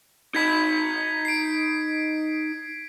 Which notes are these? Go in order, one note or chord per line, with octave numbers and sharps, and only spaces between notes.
D#4 B5 G#6 B6
C7 D7